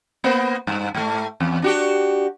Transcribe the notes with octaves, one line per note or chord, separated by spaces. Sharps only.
A#3 B3 C5
G2
G#2 A3
E2
D4 F#4 G4